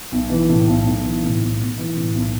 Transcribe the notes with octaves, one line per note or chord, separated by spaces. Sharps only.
B1
E3
A2
B1
B1
E3
A2
B1
B1
E3
A2
B1